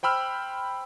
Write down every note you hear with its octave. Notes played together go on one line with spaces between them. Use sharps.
C5 G5 B5 E6 F6